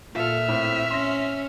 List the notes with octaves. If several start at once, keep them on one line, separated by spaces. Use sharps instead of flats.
A#2 F4 A4 E5 F6
A2 C4
C#4 C6 A#6